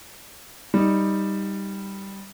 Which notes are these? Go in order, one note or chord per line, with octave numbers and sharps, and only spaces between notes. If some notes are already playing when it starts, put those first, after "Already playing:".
G3 D#4